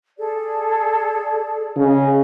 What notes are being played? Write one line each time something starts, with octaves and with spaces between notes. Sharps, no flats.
G#4 A4 D5
C#3 D#5